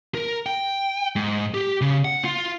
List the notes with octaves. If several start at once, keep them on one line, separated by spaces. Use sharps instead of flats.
A#4
G5
G#2
G4
C#3
F#5
F4